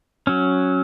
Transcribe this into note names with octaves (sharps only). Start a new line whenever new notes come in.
F#3 C#4